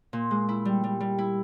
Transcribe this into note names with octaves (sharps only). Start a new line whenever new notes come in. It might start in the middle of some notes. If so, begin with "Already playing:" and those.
A#2
G#3
E4
G3
G3
G3
E4